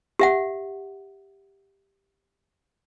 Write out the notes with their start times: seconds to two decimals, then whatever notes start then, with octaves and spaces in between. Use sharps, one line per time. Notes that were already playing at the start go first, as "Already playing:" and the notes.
0.19 G4 E5 F#5